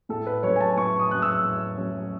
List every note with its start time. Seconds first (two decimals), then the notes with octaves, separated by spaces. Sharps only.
0.09 A2 A4
0.26 B4
0.43 F#3 C#4 C#5
0.56 G#5
0.61 A5
0.77 A2 C#6
0.99 D#6
1.11 F#3 C#4 F#6
1.22 E6
1.44 A2
1.78 F#3 C#4